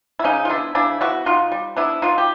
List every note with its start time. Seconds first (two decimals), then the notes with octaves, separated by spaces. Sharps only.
0.19 E4
0.24 C#3 C#4 D#4
0.45 F4
0.49 B3 D4 E4
0.75 C#3 D4 E4
1.01 B3 E4 F#4
1.26 B2 D#4 F4
1.52 G3
1.77 B3 D4 E4
2.02 B2 D#4 F4
2.18 G4